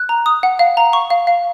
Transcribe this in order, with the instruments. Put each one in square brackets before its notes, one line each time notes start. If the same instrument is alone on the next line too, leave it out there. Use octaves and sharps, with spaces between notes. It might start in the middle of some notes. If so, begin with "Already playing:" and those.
Already playing: [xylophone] F#6
A#5
D#6
F#5
F5
A#5
C#6
F5
F5